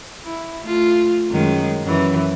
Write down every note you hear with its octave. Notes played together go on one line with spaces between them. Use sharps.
E4
A3 F4
F#2 D#3 G#3
F#2 E3